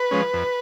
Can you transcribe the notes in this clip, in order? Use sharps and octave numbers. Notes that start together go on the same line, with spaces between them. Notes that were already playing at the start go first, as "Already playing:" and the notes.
Already playing: B4
F3 G#3 C#4
F2